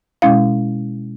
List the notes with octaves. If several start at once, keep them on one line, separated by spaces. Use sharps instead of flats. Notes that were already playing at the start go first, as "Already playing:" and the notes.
B2 G#3 C#4 E4 F5